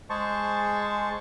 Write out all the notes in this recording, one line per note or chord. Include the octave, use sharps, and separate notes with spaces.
G#3 G#4 C5 A5 C#6